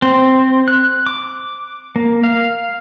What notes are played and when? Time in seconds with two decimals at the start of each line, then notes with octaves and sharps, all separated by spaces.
0.02 C4
0.68 F#6
1.06 D6
1.96 A#3
2.23 F5